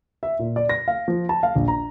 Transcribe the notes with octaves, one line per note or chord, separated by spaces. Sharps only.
E5
A#2
D5
A#6
F5
F3
A5
F5
A#1
A#5